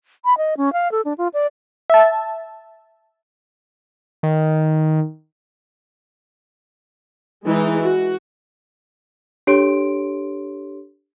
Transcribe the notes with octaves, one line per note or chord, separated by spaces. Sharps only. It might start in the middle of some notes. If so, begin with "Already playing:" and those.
B5
D#5
C#4
F5
A4
D4
F4
D5
E5 A5
D#3
E3 G#3 D#4
F#4
D4 G4 A4 C#5 C6 D7